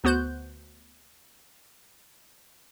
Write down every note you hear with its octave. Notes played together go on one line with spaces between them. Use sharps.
D2 B3 F#4 C5 F#6 G6